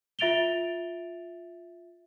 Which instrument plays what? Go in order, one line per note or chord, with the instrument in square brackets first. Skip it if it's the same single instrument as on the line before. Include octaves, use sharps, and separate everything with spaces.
[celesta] F4 E5 A6 D7 F7 G7